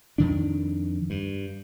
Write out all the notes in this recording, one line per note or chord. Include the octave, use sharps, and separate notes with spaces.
F2 D#3 D4
G2